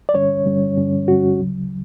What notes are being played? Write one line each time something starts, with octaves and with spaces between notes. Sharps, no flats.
D5
G2 D3 G3 C#4 C#5
G2 D3 G3 C#4
G2 D3 G3 C#4
G2 D3 G3 C#4 F#4
D2 C#3 F#3